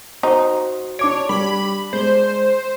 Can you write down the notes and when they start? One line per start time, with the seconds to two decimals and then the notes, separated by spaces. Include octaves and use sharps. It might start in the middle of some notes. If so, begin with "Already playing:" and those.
0.23 D#4 F#4 C5
0.99 D4 C#5 D6 D7
1.29 G3 B5
1.93 G#3 C5